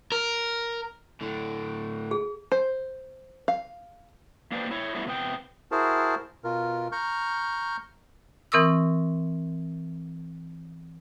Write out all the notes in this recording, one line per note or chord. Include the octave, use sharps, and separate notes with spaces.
A#4
A2 D3
G#4
C5
F5
A#3 D4 G4 B4 C5 D5
E4 C#5
F#3 G3 A3 B3 E4
C3 B3 G5
E4 F#4 G#4 A#4 C5 A5
B2 F4 A#4
A#5 C#6 F6 G6
E3 C4 A#4 C#6 D#6 E6